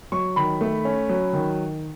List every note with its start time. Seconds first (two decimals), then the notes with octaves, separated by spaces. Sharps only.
0.12 F#3 C#6
0.36 D#3 B5
0.61 A3
0.85 C#4
1.09 F#3
1.33 D#3